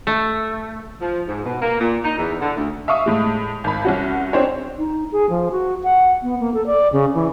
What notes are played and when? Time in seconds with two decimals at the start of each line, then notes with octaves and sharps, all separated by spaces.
0.07 A3
1.01 F3
1.27 G#2
1.45 B2
1.62 A#3
1.81 A#2
2.04 D#4
2.18 E2
2.41 D3
2.56 D2
2.88 E5 F5 C#6 D#6
3.06 A2 G#3
3.64 G#1 B5
3.85 C2 C#4 F#4
4.33 C4 D4 C5 C#5
4.78 D#4
5.12 G#4
5.30 F3
5.51 F#4
5.84 F#5
6.23 B3
6.40 A#3
6.54 A4
6.66 D5
6.93 C#3
7.14 E3